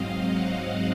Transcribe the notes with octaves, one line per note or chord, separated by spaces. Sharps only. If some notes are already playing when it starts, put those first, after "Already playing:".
Already playing: G#2 F#3 C4 D#5 F5
F#5